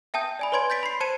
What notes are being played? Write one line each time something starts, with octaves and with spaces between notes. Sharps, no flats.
E5 G5 A5 D#6 G6
D5 G#5 B5
B4 C#5 C6 G#6 D7
G6 A6 B6 D7
B5 C6 C7
C5 A5 G#6 C#7 D#7 E7